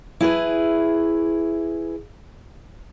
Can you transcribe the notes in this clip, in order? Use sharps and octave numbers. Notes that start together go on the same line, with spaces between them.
E4 G#4 B4